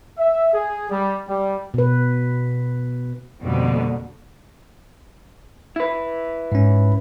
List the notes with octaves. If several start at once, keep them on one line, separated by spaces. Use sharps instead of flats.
E5
G#4
G3
G3
B2 B4
F2 B2 D3 G3 A#3 B3
E4 B4
G#2 C#4